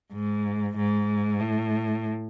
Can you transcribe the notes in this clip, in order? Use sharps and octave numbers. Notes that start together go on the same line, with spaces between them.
G#2
G#2
A2